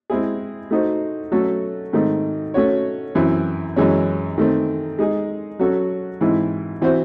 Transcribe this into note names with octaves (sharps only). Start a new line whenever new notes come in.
G#3 C4 E4 G#4
A3 D#4 F#4 C5
F#3 A3 C#4 F#4 A4
G#2 D#3 A3 C4 D#4
A3 C#4 F#4 C#5
F#2 E3 C4 E4
F#2 E3 G#3 C#4
D#3 A3 C4
G#3 D#4 G#4
F#3 C#4 F#4 A4
G#2 E3 C4 E4
E3 C4 F#4 C5 E5